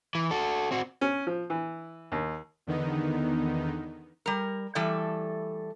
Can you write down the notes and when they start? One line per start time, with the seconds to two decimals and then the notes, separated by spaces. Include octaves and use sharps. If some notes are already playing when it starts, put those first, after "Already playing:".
0.15 E3
0.31 F#4 A4
0.71 C4 F#4
1.01 C#4
1.27 F3
1.50 E3
2.12 D#2
2.67 E2 D3 D#3 B3 D#4
4.26 G3 A#4
4.75 E3 G3 A3 A4 D5